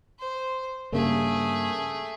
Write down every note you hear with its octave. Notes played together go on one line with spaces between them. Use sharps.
C5
G2 C#3 A3 A#3 G#4